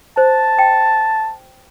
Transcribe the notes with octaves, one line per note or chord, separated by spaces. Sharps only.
C5 A5
G5